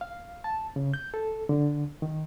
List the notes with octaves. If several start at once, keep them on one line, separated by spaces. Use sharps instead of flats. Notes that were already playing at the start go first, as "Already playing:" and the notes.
F5
A5
C#3
G6
A4
D3
D#3